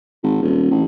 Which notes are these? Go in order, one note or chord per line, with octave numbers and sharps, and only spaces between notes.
G#1
D#1
A1